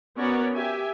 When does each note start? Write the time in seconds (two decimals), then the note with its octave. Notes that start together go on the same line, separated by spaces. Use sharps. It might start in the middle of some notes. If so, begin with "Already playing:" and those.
0.18 B3 C#4 F#4 A#4 C#5 D5
0.54 G4 E5 G#5